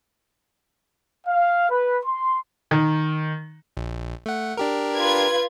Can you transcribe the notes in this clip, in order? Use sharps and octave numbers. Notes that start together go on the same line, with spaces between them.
F5
B4
C6
D#3
A#1
A3 F#5
D4 G4 A#4
F4 B4 G#6